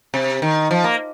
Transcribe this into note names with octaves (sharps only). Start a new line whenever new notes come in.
C3
D#3
F3
A#3